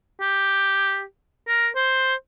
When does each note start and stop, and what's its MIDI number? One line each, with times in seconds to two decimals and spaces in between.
0.21 1.03 67
1.48 1.68 70
1.76 2.14 72